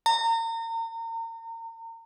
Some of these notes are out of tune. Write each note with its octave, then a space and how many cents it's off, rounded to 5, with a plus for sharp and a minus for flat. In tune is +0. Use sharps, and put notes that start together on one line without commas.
A#5 -35